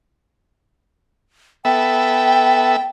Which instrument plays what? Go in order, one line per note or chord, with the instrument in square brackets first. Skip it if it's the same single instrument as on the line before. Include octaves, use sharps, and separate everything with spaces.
[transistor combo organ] B3 A4 E5 [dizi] G5